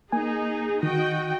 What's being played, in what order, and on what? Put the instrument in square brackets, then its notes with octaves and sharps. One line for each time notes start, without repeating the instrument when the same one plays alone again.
[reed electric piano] A#3 G#5 [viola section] D#4 G#4
[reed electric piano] D#3 [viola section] F#4 D#5 G5